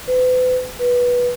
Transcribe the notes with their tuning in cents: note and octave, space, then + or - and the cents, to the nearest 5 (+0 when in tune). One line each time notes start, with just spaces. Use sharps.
B4 +40
B4 -15